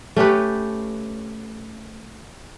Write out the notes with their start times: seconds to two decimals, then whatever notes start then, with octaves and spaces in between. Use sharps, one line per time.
0.16 A3 C#4 G4 B4